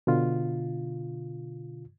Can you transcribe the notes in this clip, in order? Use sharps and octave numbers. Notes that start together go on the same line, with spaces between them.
B2 D3 F4